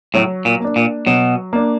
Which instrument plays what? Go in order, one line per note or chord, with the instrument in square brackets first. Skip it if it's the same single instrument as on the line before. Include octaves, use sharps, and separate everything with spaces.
[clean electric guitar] A2 [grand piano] F#3
[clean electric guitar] A#2
[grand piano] A#3 D4
[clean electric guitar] A#2
[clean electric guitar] B2 [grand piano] F#3
[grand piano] A#3 D4